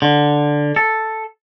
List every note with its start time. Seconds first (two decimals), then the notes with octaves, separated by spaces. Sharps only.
0.02 D3
0.76 A4